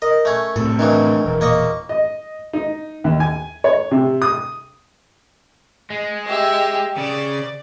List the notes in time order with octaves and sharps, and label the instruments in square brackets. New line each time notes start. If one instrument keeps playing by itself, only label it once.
[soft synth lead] A#4 [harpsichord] D#5
[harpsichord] A3 C#4
[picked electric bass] A2 C3 [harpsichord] A4
[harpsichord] D#3 E3 F#3 [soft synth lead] D4
[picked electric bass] E1 [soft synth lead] A#4
[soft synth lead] A#2 [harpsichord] A#3 D#5 C#6
[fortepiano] D#5
D#4
D#2
G#5
C#5
C3
D#6
[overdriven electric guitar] G#3
[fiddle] G4 E5
[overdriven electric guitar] C#3 [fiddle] D5